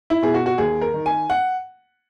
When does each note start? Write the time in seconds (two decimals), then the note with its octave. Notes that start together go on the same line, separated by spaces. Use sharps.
0.10 E4
0.22 B2 G#4
0.34 F#4
0.46 F#4
0.58 D#2 G#4
0.81 A#4
0.94 D#3
1.06 G#5
1.30 F#5